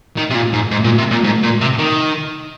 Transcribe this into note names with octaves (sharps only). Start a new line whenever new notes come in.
D#3
C3
A#2
G#2
G#2
A#2
C3
A#2
G#2
A#2
C3
D#3